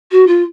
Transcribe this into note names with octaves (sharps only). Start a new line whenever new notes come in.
F#4
F4